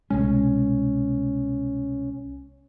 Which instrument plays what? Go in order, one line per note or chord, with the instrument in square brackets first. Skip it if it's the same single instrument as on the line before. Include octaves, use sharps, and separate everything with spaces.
[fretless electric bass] C2 B2 G#3 [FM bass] C#4